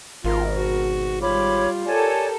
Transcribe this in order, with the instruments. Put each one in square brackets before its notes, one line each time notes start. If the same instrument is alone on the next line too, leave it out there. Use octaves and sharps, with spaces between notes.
[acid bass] G#1 [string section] B2 [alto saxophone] F4 [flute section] A#4
[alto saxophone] F#4
[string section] G3 [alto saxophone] F4 [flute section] C#5 B5 D6
[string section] G4 A4 A#4 [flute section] C#5 D5 G#5